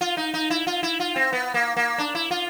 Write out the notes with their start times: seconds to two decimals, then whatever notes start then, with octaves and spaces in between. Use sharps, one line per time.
0.01 F4
0.17 D#4
0.34 D#4
0.50 E4
0.67 F4
0.83 E4
1.00 F4
1.16 C4
1.33 B3
1.54 A#3
1.77 A#3
1.98 D4
2.15 E4
2.31 F4